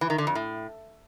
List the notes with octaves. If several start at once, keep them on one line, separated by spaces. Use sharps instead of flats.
E3
D#3
D3
F2
A2